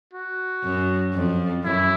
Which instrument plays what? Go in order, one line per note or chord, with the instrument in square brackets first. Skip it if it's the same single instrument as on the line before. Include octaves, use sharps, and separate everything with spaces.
[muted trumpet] F#4
[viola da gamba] F#2
F2
[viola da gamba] F#2 [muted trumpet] E4